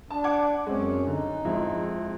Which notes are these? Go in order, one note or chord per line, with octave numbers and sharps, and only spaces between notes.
D4 A5
F#5 D6 G#6
F#2 G#3 C4 C#4
D3 D#4
F2 G#2 E4